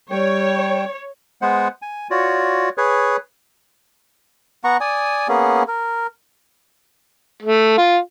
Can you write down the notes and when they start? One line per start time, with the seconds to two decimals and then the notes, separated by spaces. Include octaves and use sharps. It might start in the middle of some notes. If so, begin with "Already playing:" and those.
0.11 G3 C#5 G5
1.42 G#3 B3 C5 F#5
1.82 G#5
2.11 F4 F#4 C#5 D5
2.77 G#4 B4 C#5
4.64 B3 F#5 A#5 C#6
4.81 D5 G#5 D#6
5.28 A#3 B3 C#4 G#4
5.68 A#4
7.43 A3
7.78 F4